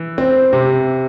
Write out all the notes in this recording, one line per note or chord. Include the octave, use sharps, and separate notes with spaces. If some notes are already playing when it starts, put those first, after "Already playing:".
Already playing: E3
C4
C3